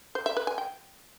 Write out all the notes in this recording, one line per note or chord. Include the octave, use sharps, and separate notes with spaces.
C5
E5
B4
G#5
G5